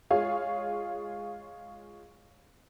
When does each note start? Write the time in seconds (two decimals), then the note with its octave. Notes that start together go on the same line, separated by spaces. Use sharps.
0.11 G#3 F4 G#4 C#5 F5